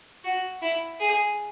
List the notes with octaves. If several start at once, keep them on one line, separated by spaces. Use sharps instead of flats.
F#4
E4
G#4